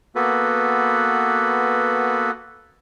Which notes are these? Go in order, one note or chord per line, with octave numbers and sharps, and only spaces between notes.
A#3 B3 F#4 A4 B4